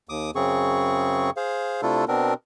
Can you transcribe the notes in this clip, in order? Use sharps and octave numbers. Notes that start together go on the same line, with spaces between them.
D#2 D6 D#6
F#2 C#3 C4 G#4 C#6
G#4 C5 F5
C3 A3 D4 E4 F4 A4
B2 B3 C4 D4 A#4